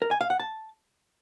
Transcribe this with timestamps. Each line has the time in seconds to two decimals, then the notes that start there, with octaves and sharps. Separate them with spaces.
0.02 A#4
0.11 G#5
0.21 F5
0.30 F#5
0.40 A5